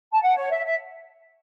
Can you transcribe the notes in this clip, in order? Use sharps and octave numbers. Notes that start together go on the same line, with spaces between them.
A5
F#5
C#5
E5
E5